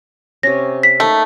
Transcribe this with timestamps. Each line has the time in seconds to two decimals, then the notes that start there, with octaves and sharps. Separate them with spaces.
0.43 C3 C#4 A#6
0.83 B6
1.00 A3 A#3 D#4